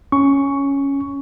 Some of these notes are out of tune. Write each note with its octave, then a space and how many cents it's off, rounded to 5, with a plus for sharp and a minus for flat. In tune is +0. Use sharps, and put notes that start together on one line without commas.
C#4 +0 C#6 +10